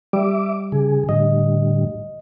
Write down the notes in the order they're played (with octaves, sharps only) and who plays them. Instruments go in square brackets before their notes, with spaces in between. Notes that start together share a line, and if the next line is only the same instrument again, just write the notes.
[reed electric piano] G3 [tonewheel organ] E5 D6
[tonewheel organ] C#3 G#4
[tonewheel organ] A2 D3 G3 [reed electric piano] D#5